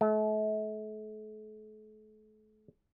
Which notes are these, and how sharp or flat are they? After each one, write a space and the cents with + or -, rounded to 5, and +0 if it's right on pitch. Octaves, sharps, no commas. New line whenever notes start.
A3 -40